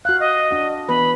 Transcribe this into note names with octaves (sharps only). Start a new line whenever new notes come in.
F#4 F5 F#6
D#5
D4 F#4
E3 B3 B4 B5